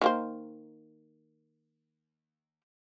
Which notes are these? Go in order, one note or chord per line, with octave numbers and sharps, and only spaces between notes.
D#3 A#3 C5